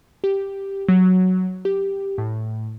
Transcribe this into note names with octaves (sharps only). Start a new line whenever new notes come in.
G4
F#3
G4
A2